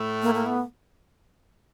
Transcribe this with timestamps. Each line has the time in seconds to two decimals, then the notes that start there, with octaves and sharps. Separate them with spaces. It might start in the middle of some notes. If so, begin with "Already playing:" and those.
Already playing: A2 A3
0.22 A#3
0.34 A#3
0.46 B3